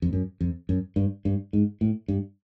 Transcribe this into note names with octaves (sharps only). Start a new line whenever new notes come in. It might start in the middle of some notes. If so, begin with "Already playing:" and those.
F2
F#2
F2
F#2
G2
G2
G#2
A2
G2